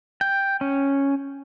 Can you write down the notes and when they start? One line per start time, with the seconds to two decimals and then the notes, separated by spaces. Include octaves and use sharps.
0.21 G5
0.61 C#4